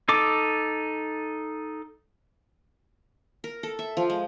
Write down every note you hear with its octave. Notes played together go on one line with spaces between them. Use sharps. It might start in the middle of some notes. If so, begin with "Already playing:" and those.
D#4 A4 D6
A#4
A4
E5
F3
G#3